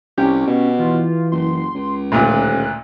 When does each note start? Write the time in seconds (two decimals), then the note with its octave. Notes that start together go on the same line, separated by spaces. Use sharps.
0.18 C2 C#4 G4
0.47 B2
0.79 E3 F4
1.32 F#1 C6
1.75 C#2
2.12 D#1 A1 D2 A#2 F#6